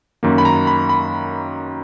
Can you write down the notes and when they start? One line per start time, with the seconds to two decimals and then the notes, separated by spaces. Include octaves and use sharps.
0.23 F#2 D#3 A#3
0.38 B5
0.45 A#5
0.67 B5
0.89 B5